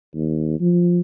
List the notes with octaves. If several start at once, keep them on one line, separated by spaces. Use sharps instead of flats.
D#2
F3